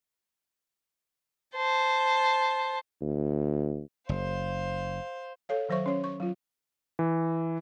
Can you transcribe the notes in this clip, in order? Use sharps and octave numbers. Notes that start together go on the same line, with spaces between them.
C5 A5
D2
F#1 C5 F5
A4 C#5 F5
D#3 F#3 C5 E5 C#6
C#4 C#5
C#6
F#3 F4
E3